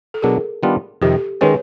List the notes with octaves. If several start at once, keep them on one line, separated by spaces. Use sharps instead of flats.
A4
B2 F#3 B3 D4 G#4 A#4
D#3 G3 B3 D4 F4
F2 C3 D#3 G4 A4
D#3 G#3 C#4 B4 C#5